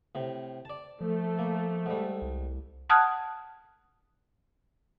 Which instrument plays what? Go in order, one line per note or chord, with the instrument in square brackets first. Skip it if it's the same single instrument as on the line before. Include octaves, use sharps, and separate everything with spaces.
[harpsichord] A2 C3
D5 A5
[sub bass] F3 [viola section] A3
[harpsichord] A#3
G#2 G3
[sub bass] C2
[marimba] F#5 A5 D#6 F6 F#6 G#6